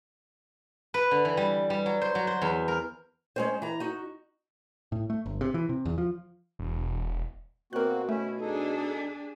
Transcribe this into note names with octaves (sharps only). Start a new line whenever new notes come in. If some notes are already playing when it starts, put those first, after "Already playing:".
B4
D3
E3
G3
G3
F#3
C5
F#3
C5
E2
A#4
G#3 C#4 C5
E3 A#5
D#4 F#4
A2
A3
G1
C3
E3
C3
E2
F3
E1
B2 A#3 C4 F#4 A#4 F#6
A3 C#4 E4
D4 D#4 G#4 A4